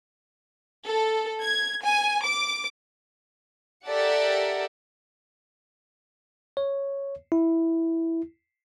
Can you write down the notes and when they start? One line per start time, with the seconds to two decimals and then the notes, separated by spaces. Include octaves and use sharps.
0.85 A4
1.42 G#6
1.83 G#5
2.24 D6
3.86 G4 A4 A#4 D5 E5 F#5
6.57 C#5
7.32 E4